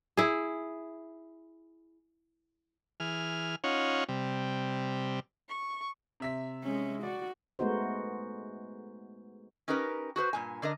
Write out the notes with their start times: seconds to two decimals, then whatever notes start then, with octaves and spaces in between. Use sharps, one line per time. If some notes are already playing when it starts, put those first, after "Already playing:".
0.17 E4 G#4
3.00 E3 G#4 F6
3.64 C#4 D#4 F4 C#5 F#5
4.08 C3 G3
5.49 C#6
6.20 C3 E5 B6
6.63 G#3 C#4
7.03 F#4 D5
7.59 G#3 A3 B3 D#4 F#4 C5
9.68 C#4 D#4 G4 A#4 B4
10.16 F#4 G#4 B4 C5
10.33 G2 A#2 G#5
10.62 D3 D4 A#4 D#5